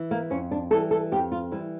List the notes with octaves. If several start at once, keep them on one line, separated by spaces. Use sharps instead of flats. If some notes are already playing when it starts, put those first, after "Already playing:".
Already playing: E3
A#3
F2 C#4
D4
E3 G3 A4
A4
F2 G4
F4
E3 G3 E4